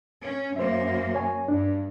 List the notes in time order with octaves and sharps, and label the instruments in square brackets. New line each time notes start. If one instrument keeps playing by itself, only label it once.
[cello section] C#4
[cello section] F#2 A#3 [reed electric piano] C5 E5
[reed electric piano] C#5 G#5
[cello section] G2 [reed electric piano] D4